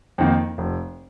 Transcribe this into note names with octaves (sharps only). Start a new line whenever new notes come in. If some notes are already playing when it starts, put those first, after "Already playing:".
F2 D#3 A#3
F1